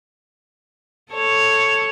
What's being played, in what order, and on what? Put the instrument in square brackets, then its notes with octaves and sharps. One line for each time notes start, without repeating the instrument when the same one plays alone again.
[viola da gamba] A4 C#5